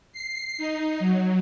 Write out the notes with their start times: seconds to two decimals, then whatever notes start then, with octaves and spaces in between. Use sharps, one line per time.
0.13 C7
0.58 D#4
0.99 F#3